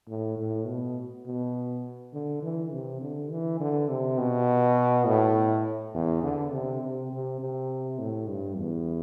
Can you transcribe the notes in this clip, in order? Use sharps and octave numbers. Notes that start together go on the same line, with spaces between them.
A2
A2
B2
B2
D3
E3
C3
D3
E3
D3
C3
B2
A2
E2
D3
C3
C3
C3
C3
A2
G2
E2